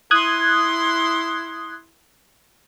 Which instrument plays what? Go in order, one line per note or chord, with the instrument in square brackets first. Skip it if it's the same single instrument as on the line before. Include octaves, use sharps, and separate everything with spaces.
[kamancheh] E4 C6 [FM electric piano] D#6 F#6 G#6